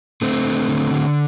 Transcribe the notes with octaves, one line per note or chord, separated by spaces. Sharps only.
D3 A3 C4
D3
D3
D3